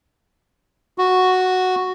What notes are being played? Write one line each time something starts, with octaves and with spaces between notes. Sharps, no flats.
F#4